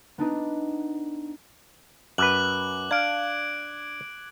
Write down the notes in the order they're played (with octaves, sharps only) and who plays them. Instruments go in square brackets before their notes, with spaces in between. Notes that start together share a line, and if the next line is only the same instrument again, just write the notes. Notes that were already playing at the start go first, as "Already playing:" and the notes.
[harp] B3 D4 D#4 B4
[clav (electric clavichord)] F#2 B4 [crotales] D6 F#6 F#7
[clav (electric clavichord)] D4 F5 [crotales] G#6 D7